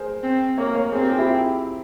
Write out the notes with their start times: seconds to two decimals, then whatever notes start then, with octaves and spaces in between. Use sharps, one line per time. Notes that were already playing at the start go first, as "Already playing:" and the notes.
Already playing: G#4 A#4 C5
0.23 C4
0.58 A#3 A#4 C#5
0.75 A#4 C#5
0.92 C4 G#4 C5
1.01 G4 A#4
1.09 F4 G#4
1.18 E4 G4